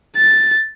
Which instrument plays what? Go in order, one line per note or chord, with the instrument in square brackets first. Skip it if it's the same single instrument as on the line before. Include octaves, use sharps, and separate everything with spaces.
[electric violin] A6